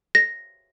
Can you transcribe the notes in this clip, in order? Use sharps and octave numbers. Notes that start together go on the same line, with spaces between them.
A#6